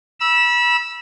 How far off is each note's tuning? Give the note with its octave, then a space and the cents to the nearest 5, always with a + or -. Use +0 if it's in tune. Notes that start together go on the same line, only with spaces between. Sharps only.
B5 -30 E6 +0